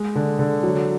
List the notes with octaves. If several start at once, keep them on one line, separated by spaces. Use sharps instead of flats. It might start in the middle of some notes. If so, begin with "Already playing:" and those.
Already playing: G#3
D3
D3
F#3